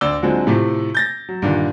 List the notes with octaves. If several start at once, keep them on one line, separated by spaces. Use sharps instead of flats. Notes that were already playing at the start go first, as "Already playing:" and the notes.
D2 D5 E6 G7
D3 F3 F#3 G#3 C4
A2 C3 F3 A3
G6 A6 A#6
F#3
G2 A#2 D3 D#3